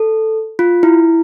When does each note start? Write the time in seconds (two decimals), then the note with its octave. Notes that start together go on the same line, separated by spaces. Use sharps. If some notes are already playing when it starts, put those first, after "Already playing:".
Already playing: A4
0.59 F4
0.83 E4